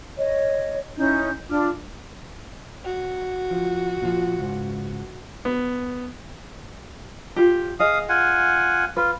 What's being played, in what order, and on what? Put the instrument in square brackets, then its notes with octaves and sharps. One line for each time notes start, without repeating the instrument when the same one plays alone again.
[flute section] C#5 D#5
C#4 D#4 E4 G6
D4 F4 D6 F6
[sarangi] F#4
[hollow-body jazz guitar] F3
A#2 D#3 F3
C#2 G#2
[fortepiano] B3
[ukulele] F4 G4
[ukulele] G#4 D#5 [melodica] F5 D#6
[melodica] F4 F#5 G#5
[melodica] F4 [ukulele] B4